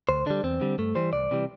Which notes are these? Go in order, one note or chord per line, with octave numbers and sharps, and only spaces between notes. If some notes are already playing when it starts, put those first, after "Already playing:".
D2 C5
D3 G3 D4
E2 C4
D3 G3
G2 A3
E3 G3 C5
C2 D5
C3 E3 G3